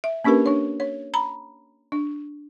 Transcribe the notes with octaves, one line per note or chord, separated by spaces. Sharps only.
E5
A#3 C#4 D4 G4 A#4 B4
D4 C#5
C#5
A#5 B5
D4